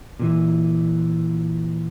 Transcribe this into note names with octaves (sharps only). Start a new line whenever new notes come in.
A#2 D#3 E3